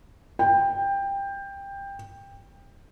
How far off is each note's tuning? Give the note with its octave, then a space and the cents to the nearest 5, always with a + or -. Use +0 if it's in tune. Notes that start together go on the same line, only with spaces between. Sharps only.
G5 +15